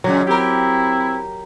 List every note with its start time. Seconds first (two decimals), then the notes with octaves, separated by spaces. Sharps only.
0.04 A#2 C#3 F#3 G#3
0.27 C4 E4 G4 A#4